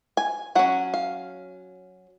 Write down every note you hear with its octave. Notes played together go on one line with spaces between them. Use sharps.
G#5
F#3 C#4 F#5
F5